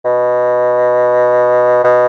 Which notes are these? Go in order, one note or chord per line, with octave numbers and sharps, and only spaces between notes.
B2
B2